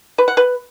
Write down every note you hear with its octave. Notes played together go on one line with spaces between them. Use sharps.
B4
F#5
B4